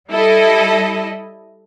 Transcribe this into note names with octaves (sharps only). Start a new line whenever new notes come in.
G3 E4 A4 D#5